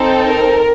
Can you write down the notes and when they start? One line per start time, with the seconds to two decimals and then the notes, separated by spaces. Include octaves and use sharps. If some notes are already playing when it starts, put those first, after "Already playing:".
Already playing: C4 D#4 A4
0.22 A#4